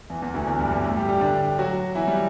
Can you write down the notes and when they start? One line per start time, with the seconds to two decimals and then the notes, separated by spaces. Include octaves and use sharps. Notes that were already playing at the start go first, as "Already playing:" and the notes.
0.10 E2 E3
0.22 E2 E3
0.34 D2 D3
0.47 E2 E3
0.59 G2 G3
0.72 G2 G3
0.84 A2 A3
0.96 G3 G4
1.09 G3 G4
1.21 D3 D4
1.58 F#3 F#4
1.95 E3 E4
2.08 G3